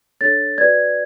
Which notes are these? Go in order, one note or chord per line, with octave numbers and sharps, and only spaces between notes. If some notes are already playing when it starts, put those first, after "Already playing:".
D4 A4 C#5 A6
F#4 B4 D5 G#6